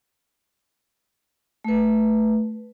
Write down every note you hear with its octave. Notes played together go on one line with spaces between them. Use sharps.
A3 B4